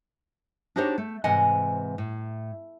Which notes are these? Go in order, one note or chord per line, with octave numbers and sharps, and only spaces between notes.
D4 D#4 F#4 G4 C5 C#5
A3
G#2 C3 E3 D#5 F#5 G#5
A2